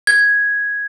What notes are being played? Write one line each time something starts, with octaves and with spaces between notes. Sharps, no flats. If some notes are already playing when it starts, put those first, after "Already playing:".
G#6